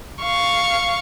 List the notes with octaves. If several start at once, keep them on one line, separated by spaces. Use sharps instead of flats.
F5 C#6